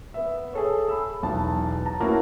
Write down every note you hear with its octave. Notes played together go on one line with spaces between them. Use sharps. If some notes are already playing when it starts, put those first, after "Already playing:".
B3 E5
G#4 A4 C#5
B5 E6
B1 E2 A5
A5 A#5
A#3 C#4 E4 F#4